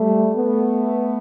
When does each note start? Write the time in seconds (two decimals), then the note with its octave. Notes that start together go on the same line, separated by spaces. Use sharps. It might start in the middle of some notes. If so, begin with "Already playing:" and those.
Already playing: G3 A3
0.35 A3 B3